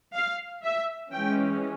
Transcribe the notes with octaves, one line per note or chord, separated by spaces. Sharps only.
F5
E5
E3 G#3 C#4 G5